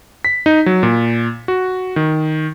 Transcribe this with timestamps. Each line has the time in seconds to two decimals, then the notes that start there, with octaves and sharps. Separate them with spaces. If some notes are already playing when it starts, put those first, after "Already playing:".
0.25 B6
0.46 D#4
0.66 F#3
0.83 A#2
1.48 F#4
1.96 D#3